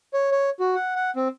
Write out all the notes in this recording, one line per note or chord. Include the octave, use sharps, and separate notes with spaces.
C#5
C#5
F#4
F#5
F#5
C4